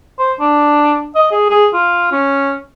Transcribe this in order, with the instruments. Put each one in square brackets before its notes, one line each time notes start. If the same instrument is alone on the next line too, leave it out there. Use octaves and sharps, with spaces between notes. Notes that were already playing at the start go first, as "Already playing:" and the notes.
[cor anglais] C5
D4
D#5
G#4
G#4
F4
C#4